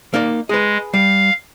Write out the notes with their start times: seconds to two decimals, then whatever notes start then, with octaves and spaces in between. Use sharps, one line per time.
0.14 A#3 D#4 D5
0.49 G#3 G#4 B4
0.94 G3 F5